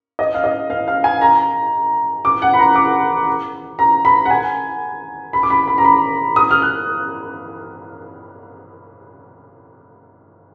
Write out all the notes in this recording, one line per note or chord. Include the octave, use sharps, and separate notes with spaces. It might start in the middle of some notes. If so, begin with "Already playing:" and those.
D#5
F5
D#5
F5
F5
G#5
A#5
D6
F#5
B5
A#5
D6
A#5
B5
F#5
G#5
B5
D6
B5
B5
A#5
B5
D#6
F6
F#6